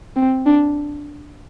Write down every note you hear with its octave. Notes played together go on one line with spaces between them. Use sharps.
C4
D4